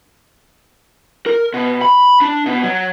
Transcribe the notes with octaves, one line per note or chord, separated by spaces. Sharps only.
A#4
B2
B5
D4
B2
F#3